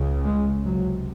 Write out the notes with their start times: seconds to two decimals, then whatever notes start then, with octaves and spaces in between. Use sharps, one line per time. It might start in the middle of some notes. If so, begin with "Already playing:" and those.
Already playing: C#2 C#3
0.25 G#3
0.65 C#2 C3 F#3